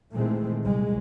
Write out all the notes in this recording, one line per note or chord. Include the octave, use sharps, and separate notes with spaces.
A#2 D#3 E3 G#3 A3 C4
C2 G#3